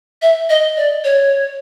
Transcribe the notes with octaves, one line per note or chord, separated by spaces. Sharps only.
E5
D#5
D5
C#5